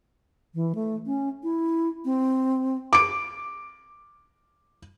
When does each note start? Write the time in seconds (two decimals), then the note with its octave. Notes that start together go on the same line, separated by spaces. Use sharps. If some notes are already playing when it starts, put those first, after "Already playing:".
0.54 E3
0.75 A3
1.06 C#4
1.43 E4
2.05 C4
2.93 D6 D7